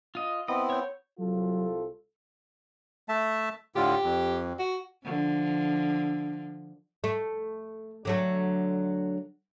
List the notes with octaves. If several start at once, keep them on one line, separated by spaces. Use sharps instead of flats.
F4 D#5
B3 C4 E4 D#5
C#5 G6
C2 F#3 F4 A4
A3 E5 A5
A2 D3 F4 G4
F2
F#4
D3 F3
A3
D3 F#3 A3